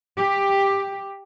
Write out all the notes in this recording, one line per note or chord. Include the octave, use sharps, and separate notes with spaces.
G4